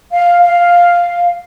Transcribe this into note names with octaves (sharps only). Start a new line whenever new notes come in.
F5
F5